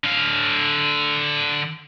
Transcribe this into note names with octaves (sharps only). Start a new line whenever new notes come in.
D3 F5